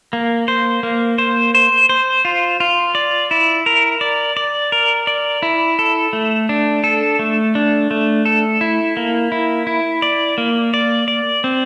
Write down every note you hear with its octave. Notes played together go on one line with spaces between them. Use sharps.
A#3
C5
A#3
C5
C5
C5
F4
F4
D5
E4
A#4
D5
D5
A#4
D5
E4
A4
A3
D4
A4
A3
D4
A3
A4
E4
A#3
E4
E4
D5
A#3
D5
D5
C4